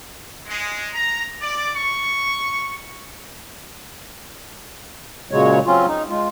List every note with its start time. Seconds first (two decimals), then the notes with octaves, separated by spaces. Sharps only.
0.46 G#3
0.93 A#5
1.41 D5
1.74 C#6
5.31 A#2 C#3 F#3 G#3 C#5
5.66 F#3 C4 C#4 F4
5.88 D#4
6.09 G#3 F4